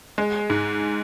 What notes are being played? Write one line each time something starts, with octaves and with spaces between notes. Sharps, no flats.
G#3
G#2